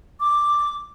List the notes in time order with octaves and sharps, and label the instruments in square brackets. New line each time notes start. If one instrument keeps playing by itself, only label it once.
[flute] D6